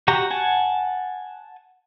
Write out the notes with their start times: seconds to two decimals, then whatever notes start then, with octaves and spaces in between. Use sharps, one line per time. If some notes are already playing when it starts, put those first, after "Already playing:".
0.08 F#4 G4 A#5
0.30 F#5 G#5 A5